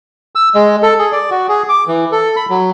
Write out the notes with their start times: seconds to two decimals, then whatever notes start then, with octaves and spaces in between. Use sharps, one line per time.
0.35 E6
0.55 G#3
0.83 A4
0.99 G#4
1.12 D5
1.31 F#4
1.49 G#4
1.69 D6
1.87 E3
2.12 A4
2.36 B5
2.50 F#3